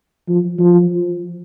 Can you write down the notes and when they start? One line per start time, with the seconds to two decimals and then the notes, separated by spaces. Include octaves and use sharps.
0.28 F3
0.59 F3